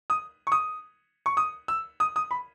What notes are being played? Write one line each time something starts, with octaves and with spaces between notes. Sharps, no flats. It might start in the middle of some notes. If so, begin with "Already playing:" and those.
D#6
C#6
D#6
C#6
D#6
E6
D#6
D#6
B5